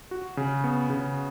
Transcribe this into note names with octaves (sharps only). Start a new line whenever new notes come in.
F#4
C#3
B3
C#3